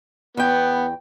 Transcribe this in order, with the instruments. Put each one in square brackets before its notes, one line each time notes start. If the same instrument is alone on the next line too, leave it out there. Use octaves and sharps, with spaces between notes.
[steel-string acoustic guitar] E2 G5 [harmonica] B3